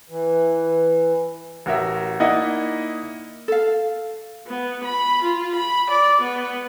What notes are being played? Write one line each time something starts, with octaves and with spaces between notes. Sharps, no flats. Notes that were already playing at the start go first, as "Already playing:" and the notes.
E3
A1 F#4 A#4 E5
A#3 D#4 E4 D5 D#5 F#5
A4 F5
B3
B5
F4
B5
D5
B3